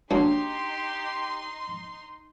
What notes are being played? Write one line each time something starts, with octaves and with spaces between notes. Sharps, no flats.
F#3 A#3 D4 D#4 G4 C6